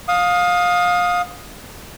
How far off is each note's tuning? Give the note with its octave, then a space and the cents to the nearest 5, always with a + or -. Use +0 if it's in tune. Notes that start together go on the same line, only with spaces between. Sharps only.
F5 +25 D#6 +0